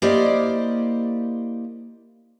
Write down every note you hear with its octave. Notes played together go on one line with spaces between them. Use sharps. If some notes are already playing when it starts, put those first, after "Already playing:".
A#3 E4 G4 C5 D5 D#5